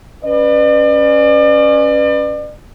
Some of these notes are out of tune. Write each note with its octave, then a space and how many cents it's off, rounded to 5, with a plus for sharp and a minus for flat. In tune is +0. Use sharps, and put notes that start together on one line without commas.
C#4 +0 B4 +0 D5 +40